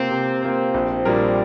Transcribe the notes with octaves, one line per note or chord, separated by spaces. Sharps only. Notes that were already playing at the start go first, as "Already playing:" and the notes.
Already playing: C3 A#3 C4 F4 C5
C3
A#3 F4 C5
A#1
A#2 G3 D4 A#4